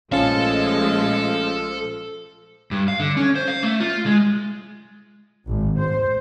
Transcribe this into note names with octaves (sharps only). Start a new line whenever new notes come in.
A#1 F3 G#3 A3 C#4 A4 F5 A5
G2
F5
D3
C#4
C5
F5
A3
F4
G#3
G#1
C5